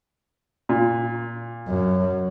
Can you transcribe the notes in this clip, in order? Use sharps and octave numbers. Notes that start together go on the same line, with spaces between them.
A#2
F#2